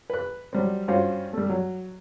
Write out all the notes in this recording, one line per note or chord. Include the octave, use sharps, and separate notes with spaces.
B4 F#6
F#3 G3 C4
G2 C#4 F4 F#4 C5
G3 A3
F#3